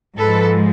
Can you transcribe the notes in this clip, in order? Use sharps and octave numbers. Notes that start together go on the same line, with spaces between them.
G#2 F3 G#3 A4 B4